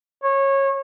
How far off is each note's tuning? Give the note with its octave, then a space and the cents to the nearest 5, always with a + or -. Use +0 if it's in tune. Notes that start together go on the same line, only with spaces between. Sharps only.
C#5 -20